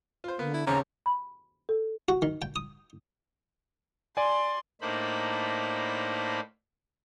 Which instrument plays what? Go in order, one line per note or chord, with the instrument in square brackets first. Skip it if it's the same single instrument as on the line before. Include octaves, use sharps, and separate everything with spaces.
[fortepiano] F4 C5
[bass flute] D3 [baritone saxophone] A#3 [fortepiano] B3
[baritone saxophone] E4
[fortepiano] A1 D#2 C4 [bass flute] C#3 [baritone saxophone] C#4 [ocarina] A#5
[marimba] B5
A4
[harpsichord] F#4
D#3
G5
D#6
[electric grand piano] D5 G#5 [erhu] C6
[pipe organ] A2 A#3 D4 D#4 C5 B5